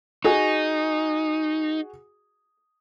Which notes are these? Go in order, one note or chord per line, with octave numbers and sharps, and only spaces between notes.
D#4 F#4 G#4